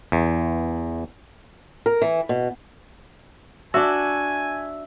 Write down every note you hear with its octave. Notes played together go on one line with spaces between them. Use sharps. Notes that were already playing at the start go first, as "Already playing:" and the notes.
E2
A#4
E3
B2
D4 F#4 E5 G#5